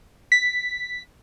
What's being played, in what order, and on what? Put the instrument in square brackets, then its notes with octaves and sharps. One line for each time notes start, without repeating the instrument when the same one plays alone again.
[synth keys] B6